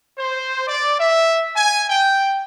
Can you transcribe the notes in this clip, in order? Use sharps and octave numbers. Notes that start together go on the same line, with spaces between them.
C5
D5
E5
G#5
G5